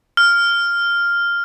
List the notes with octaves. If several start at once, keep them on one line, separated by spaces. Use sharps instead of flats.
F6